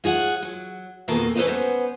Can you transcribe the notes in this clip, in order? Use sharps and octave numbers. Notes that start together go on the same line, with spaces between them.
F4 G#4 C#5 F#5
F#3
F2 B2 D#3 A#3 G#4 A4
C#4 A4 B4 C5 D5 D#5
B3 C#4 C5